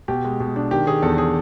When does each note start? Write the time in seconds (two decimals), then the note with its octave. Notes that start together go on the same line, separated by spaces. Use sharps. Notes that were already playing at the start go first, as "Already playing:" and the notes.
0.08 B2 G4
0.25 G#3
0.40 B2
0.56 D4
0.71 D#3 G4
0.87 D#3 G#4
1.02 E2 A4
1.18 G#4